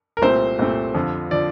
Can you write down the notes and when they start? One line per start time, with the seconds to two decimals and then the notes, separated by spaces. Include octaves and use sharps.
0.17 A#4
0.22 C2 A#2 A3 C4 C5
0.59 C2 A#2 A3 C4
0.95 F2 D3 F3
1.31 D3 F3 D5